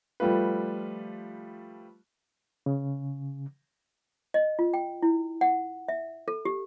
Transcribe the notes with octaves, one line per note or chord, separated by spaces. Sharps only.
F3 G3 A3 F4 B4
C#3
D#5
F4
G5
E4
F#5
E5
A4
G4